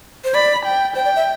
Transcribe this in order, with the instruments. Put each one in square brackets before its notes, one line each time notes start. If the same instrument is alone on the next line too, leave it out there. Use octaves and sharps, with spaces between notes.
[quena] C5
[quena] D5 [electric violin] B5
[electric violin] G5
[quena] C5 [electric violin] G5
[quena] D5
E5